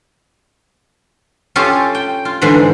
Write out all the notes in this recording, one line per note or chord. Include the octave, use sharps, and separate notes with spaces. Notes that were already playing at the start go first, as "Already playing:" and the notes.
C#4 F4 G4 A4 G#5 A5
G5
F4
G#2 D3 E3 G#3 C5